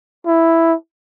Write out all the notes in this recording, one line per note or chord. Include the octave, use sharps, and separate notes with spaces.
E4